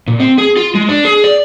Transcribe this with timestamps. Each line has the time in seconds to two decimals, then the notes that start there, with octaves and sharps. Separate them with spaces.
0.07 A#2
0.20 C4
0.38 G#4
0.57 F4
0.75 G#3
0.89 D4
1.05 G#4
1.24 D5